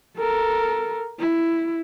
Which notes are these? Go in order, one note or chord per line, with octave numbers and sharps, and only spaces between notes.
A4 A#4
E4